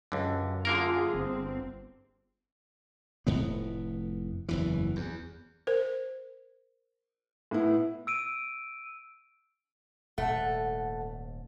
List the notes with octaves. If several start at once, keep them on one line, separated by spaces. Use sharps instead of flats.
C#2 F#2 D3
D3 A#3 F4 G#4 A#4
G1 C4
F1 F2 A2 B3
F#1 E2 E3
E2
A#4 C5
A2 B3 E4
E6 D7 D#7
D#1 G#2 A3 F#5 A5